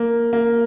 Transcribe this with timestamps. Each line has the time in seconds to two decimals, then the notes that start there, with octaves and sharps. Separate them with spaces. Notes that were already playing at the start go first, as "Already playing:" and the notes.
Already playing: A#3
0.33 A#3